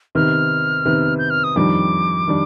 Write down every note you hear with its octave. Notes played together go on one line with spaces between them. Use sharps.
C3 D#3 B3 F6
C3 D#3 B3
G6
F6
D#6
F2 D#3 G3 D4 D6
D#3 G3 D4